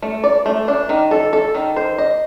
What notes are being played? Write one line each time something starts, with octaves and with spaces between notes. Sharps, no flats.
A3
D5
A3
D4
D#3
A4
A4
D#3
C5
D#5